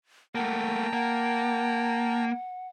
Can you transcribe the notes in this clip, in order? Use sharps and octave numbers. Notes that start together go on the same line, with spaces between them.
A3 A#3 F#5 G5 A5 A#5
A#3 F#5